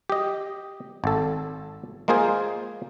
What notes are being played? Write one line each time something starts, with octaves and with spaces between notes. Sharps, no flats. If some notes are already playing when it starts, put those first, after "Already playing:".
G4 D#5
G#1 A4
G#3 A#3 F4 G#4 C5